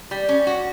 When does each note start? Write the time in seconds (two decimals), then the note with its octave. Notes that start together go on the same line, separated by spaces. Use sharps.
0.11 G3
0.29 C#4
0.47 F#4